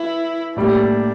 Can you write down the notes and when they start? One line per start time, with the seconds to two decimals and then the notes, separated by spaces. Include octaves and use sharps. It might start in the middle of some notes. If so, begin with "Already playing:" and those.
Already playing: E3 E4
0.56 A2 G3 A#3 D4